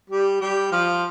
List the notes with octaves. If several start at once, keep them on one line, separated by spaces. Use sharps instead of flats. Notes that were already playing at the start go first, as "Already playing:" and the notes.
G3 G4
G3 G4
F3 F4